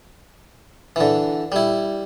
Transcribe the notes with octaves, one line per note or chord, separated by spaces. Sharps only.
D3 E3
G3 E4